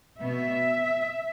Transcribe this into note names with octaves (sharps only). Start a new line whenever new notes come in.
B2 B3 E5